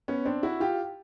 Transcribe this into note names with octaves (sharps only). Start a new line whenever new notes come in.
B3 C#4
C4 D4
E4 F#4
F4 G4